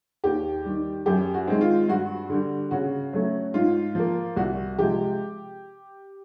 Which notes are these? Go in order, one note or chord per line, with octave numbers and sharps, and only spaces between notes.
D#2 G4
D#3 G3
F#2 G4
F#4
D#3 G#3 C4
F4
G2 F#4
D3 G3
C#3 F#4
F#3 A3 C#4
G#2 F4
F3 A#3
C2 F#4
C3 F3 G#3 G4